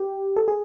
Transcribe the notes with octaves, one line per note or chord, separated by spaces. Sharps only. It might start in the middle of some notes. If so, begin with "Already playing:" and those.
Already playing: G4
A4
G#4